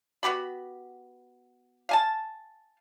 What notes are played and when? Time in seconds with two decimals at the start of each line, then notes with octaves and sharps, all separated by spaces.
0.23 B3 F#4 G4 B5
1.89 F5 G#5 A5